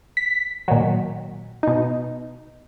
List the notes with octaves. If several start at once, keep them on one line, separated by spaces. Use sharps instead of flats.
B6
A#2 D#3 F#3
B2 D#4